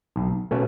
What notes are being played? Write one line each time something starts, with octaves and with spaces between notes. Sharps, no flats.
B1
B2 A3 C#4